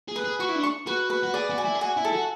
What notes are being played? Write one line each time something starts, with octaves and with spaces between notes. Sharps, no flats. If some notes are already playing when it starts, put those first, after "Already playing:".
G#4
B4
G#4
F#4 C#6
E4
D4
C#6
F#4 B4
B4
F#4
G#4 D5
F#4
G#5
E4
G#4
F#4 G#5
E4
A4
F#4